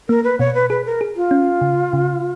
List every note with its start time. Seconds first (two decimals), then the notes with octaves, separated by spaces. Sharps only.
0.09 A#3 A#4
0.24 B4
0.39 B2 C#5
0.55 B4
0.70 G#4 B4
0.85 A#4
1.01 G#4
1.16 F4
1.31 C#4
1.61 C#3
1.93 C#3